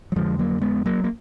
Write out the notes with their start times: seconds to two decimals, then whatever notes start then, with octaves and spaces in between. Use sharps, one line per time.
0.12 F#3
0.16 F2 D3 F3 G#3
0.39 F#3 A#3
0.62 G#3 B3
0.86 F#3 A#3
1.04 A#3